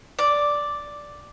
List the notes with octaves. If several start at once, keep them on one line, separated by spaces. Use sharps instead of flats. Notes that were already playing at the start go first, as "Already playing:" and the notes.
D5